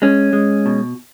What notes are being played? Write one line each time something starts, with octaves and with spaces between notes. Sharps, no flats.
G#3 C#4
G#3
B2